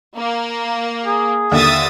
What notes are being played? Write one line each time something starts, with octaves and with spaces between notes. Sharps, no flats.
A#3
G#4
D#2 D3 E5 D#6 A6